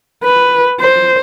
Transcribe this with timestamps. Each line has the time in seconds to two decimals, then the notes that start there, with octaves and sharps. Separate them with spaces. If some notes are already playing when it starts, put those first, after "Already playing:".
0.24 B4
0.80 C5